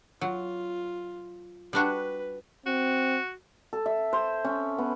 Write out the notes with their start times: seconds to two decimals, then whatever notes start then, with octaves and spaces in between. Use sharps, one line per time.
0.21 F#3 F4
1.73 G3 D4 F#4 B4
2.66 C4 F#4
3.73 A4
3.86 E5
4.13 C5
4.45 C#4
4.78 B3